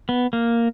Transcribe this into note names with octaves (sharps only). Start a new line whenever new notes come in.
B3
A#3